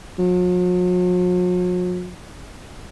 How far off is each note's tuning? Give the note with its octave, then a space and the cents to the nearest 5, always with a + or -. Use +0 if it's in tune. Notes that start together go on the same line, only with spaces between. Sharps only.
F#3 -45